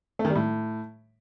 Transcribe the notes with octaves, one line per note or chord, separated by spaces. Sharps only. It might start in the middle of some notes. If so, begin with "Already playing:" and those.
A3
D#3
G3
A2